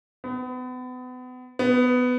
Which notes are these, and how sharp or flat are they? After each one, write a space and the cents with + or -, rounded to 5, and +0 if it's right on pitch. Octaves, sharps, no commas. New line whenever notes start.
B3 +35
B3 +15